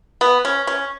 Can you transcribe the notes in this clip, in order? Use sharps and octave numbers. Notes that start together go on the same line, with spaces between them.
B3
C#4
C#4